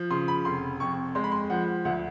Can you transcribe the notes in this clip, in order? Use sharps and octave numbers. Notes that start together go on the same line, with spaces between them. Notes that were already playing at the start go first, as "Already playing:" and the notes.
Already playing: F3
C#3 C6
B5
F1 C6
F2 C#6
G#3 C6
B5
C6
F3 F#5
D2 F#5